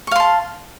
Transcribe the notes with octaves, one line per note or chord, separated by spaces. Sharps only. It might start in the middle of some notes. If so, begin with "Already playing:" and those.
F5 A5 C6 C#6